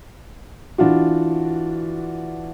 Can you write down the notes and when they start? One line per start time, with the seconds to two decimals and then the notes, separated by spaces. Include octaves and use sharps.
0.78 E3 D4 F4 F#4